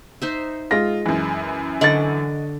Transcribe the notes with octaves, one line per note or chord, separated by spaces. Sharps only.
D#4 C5 E5
G#3 F4 A#6
F#2 E3
D3 D#5 F#5 C#6 A6